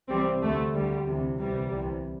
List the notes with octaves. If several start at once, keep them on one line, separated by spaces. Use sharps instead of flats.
C2 C3 E3 G3 C4
D2 D3 A3
D2 D3 G3
D2 C3 E3
C2 C3 E3 G3
C2 C3 E3